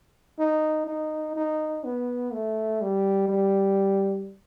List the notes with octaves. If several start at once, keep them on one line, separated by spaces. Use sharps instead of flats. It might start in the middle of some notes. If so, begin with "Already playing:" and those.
D#4
D#4
D#4
B3
A3
G3
G3